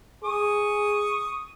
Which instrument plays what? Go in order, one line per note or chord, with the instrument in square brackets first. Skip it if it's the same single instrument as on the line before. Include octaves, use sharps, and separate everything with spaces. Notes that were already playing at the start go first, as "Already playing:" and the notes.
[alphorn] G#4 [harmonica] C#6 D#6